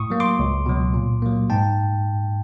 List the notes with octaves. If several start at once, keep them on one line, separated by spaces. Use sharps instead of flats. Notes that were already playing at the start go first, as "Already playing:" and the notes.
Already playing: A2 C#6 D#6
F#3 A#3
C6 D6
C#2
B2 F#3
A#2
F#3 A#3
G#2 G5 A5